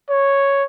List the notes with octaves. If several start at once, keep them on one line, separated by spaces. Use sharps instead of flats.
C#5